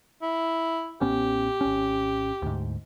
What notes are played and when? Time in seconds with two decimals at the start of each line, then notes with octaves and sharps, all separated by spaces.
0.22 E4
1.01 A1 B3 C#4 G4
1.61 G#1 C#4
2.42 D2 G#2